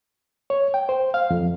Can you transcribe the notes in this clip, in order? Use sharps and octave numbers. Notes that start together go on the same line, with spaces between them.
C#5
G5
C5
F5
F2